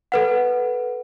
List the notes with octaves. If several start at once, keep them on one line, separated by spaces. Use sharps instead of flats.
A4 B4 F#5